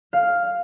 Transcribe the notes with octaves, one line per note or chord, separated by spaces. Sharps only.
F5